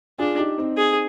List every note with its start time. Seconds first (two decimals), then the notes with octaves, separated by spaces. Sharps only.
0.19 D4 F4 G#4
0.38 D#4 G4
0.58 C4 D#4
0.77 G#4